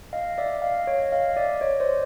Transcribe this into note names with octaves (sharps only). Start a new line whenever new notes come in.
D#5 F5
D5 E5
D#5 F5
C#5 D#5
D#5 F5
D5 E5
C#5 D#5
C5 D5